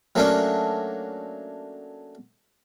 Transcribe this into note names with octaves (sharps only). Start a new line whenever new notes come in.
F#3 A3 A#3 C#4 D4